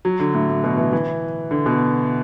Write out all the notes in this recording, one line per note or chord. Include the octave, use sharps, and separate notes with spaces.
F#3
D3
A2
A2
B2
E3
E3
D3
B2